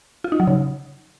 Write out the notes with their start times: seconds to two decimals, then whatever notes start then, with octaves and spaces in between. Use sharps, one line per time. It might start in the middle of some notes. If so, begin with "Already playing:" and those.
0.24 F4
0.32 D#4
0.40 F#3
0.47 C#3